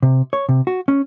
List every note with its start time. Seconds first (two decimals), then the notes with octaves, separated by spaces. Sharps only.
0.03 C3
0.33 C#5
0.49 C3
0.67 F#4
0.88 C#4